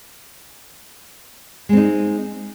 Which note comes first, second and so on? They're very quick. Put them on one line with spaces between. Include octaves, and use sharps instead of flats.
G#3 C4 D#4